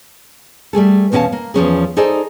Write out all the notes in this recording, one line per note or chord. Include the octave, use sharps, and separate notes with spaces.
G3 A3 G#4 A4
E2 B2 C#4 G4 F5 A5
A#3
E2 F3 C#4 G#4
D#4 G#4 A4 C5 D5